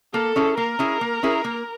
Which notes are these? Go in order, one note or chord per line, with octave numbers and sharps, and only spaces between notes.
A#3 A4
C#4 E4 G#4
A#3 A#4
C#4 E4 G#4
A#3
C#4 E4 G#4
A#3